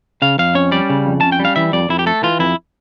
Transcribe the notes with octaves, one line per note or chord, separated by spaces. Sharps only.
C#3 F5
F2 F5
C#4 C#5
G3 D5
C#3
F2
C#4 A5
G5
G3
F5
E3 E5
F2 D5
F2 E4
G4
A3 A4
E3 F4
F2 E4